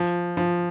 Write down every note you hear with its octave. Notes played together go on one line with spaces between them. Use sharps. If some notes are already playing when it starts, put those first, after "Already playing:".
Already playing: F3
F3